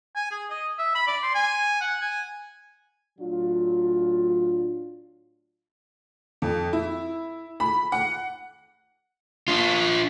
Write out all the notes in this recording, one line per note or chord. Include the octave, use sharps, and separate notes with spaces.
G#5
G#4
D#5
E5
B5
D5
C6
G#5
F#5
G#5
A2 F#3 D4 F4
F2
E4
B5
F#5
D4 F4